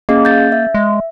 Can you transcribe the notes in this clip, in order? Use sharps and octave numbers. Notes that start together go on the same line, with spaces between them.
A#3 C#4 G#4 D#5
G6 A6
E5
G#3